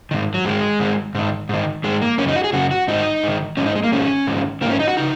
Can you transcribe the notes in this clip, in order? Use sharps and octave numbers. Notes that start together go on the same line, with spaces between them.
G#2 D#3
F#3
G#2 D#3 G#3
G#2 D#3
G#2 D#3
G#2 D#3
G#2 D#3 G#3
A#3
F#2 C#3 C#4
D#4
F#4
G#4
F#2 C#3 F#4
F#4
G#2 D#3 D#4
G#2 D#3
G#2 D#3 C#4
D#4
G#3
A#3
G#2 D#3 C#4
G#2 D#3
G#2 D#3 A#3 C#4
D#4
F#4
C#3 D#4